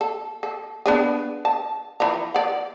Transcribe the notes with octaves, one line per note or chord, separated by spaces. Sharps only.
A4
A4
B3 D4 G#4
A5
E3 F3 A#5
D5 F#5